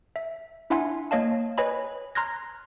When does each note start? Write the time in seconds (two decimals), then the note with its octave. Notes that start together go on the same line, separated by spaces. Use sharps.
0.16 E5
0.70 D4 E4 E5 F#5 G#5 C6
1.11 A#3 C#5 D#5 F5 A5
1.58 B4 C#5 D#5 G#5 B5
2.15 A#5 C6 F6 F#6 G#6 A#6